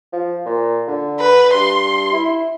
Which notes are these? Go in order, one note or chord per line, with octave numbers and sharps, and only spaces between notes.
F3
A#2
D3
B4
G2 C6
E4